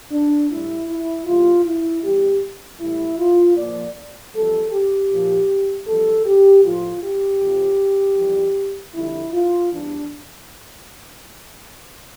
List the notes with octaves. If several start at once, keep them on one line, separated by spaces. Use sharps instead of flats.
D4
A2 G3 E4
E4
E2 C3 G3 F4
E4
E2 E3 G3 G4
A2 E3 G3 E4
F4
A#2 F3 D5
F2 E3 G3 A4
G4
A#2 F3
F2 E3 G3 A4
G4
A2 F3 F4
G4
F2 C3 F3
F2 E3 G3
F2 D3 G3 E4
F4
E2 E3 G3 D4